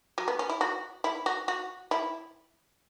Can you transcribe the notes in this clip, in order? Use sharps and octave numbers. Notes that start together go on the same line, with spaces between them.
F#3
B3
C#4
E4
F#4
E4
F#4
F#4
E4